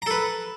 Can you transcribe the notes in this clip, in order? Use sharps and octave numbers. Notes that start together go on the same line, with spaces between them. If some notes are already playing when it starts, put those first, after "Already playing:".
A4 B4 A#5